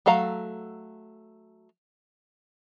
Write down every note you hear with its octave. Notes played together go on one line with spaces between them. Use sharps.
F#3 A3 A4 F5 A#5